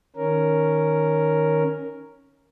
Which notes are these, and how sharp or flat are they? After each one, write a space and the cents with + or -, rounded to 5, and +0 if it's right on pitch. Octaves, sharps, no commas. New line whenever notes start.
D#3 +0 C#4 +0 A#4 +0